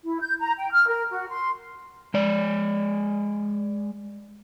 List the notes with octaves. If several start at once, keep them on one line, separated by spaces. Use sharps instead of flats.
E4
G6
A#5
G5
F6
A#4
F#4
C6
G#3 D5